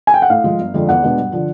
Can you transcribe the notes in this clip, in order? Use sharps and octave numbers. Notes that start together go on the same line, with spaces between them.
G#5
G5
F#5
A2 F5
F3 G#3
G1
F2 D3 F3 G#3
E2 F#5
B2 G#3 B3 D4
G2
D3 F3